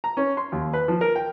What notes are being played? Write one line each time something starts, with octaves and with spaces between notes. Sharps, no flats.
A#5
C#4
C6
D#2
B4
F3
A#4
G5